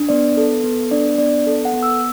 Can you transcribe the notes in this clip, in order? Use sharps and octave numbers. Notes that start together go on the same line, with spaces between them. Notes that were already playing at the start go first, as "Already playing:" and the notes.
Already playing: D4
B3 D5
A4
B3
D4 D5
B3 D5
A4
F#5
B3
E6